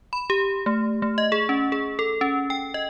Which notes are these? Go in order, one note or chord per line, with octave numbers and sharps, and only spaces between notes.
B5
G4
A3
A3
D#5
G#4
C#4
G#4
A4
C#4
G5
D#5